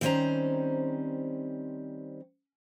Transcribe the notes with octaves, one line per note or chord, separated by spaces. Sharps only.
D#3 G3 C4 C#4 C5 A#5